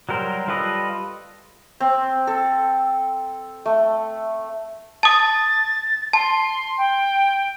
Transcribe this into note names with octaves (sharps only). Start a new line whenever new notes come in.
F#3 G3 A#4 C5
G3 F4 A4 B4 D#5
C4
A4
A3
A5 D#6 A6
A5 C6
G5